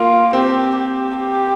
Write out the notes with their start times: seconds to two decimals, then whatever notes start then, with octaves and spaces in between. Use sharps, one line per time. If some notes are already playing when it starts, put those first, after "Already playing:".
Already playing: A#3 F4
0.33 C4 G4
0.75 G4
1.17 G4